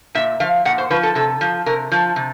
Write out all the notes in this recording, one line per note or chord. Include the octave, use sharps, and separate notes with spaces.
A#2 E5
F3 F5
A#2 F#5
C5
F3 B4
A4
C3 A4
F3
C3 A#4
F3
C3